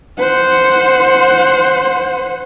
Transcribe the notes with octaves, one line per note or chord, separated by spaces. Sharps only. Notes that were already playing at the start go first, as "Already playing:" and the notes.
C5 F#5